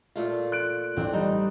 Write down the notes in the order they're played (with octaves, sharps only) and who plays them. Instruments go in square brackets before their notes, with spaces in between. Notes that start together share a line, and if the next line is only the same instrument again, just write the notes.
[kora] A#2 A3 F4
[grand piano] F#6 D7
[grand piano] A1 [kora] C4 D4
[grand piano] G3 [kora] D#4